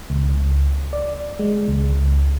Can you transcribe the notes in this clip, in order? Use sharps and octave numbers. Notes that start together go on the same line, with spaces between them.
C#2
D5
G#3
C#2